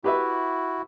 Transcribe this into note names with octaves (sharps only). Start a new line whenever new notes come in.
E4 F#4 G4 B4 E5